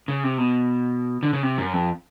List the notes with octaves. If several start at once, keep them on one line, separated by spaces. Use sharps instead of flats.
C#3
C3
B2
D3
C#3
C3
F#2
F2